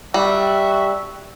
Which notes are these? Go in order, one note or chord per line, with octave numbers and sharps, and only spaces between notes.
G3 F#4 A4 E5